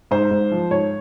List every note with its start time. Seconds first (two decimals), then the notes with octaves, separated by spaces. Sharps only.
0.11 G#2 C5
0.31 G#2
0.51 F3
0.71 G#2 C#5